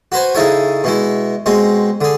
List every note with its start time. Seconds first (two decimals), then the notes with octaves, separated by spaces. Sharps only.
0.12 F#4 B4 C5 G#5
0.35 C#3 D#4 E4 A4 C#5
0.84 B2 G#3 E4
1.46 B2 G#3 C4
2.01 D3 G#4